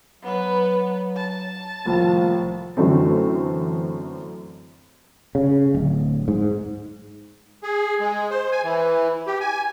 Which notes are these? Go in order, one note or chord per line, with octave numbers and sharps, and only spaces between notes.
F#3 B3 B4
A5
C2 A2 D#3 F3
F#2 D3 E3 A3 C4
C#3
D1
G#2
G#4
G#3
C5
G#5
E3
G4
G#5